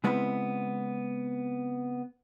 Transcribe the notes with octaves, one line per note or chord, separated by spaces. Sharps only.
C#3 G#3 B3 C4 E4 B4